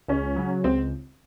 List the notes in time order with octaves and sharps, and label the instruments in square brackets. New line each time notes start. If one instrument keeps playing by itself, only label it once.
[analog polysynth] C#2 [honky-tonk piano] C#4
[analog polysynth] C#3 F#3
[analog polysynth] C#2 [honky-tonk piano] C4